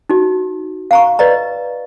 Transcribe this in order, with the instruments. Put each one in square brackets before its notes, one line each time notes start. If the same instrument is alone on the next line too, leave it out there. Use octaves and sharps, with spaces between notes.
[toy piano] D#4 F#4
F5 A#5 C#6
B4 D5 D#5 A#5